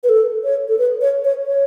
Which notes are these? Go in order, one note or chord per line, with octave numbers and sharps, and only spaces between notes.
B4
A4
C#5
A4
B4
C#5
C#5
C#5